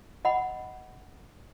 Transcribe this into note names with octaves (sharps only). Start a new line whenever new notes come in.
D#5 F#5 B5